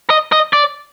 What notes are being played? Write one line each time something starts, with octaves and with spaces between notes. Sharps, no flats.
D#5
D#5
D5